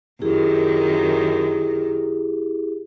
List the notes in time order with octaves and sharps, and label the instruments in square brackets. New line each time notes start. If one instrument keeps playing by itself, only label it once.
[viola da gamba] F#2 D#3 [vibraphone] E4 G4 G#4